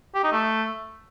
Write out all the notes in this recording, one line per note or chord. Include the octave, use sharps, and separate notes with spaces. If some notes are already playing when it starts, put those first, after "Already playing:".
G4
D#4
A3